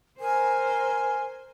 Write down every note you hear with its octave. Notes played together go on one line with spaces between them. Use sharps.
A#4 C5 G#5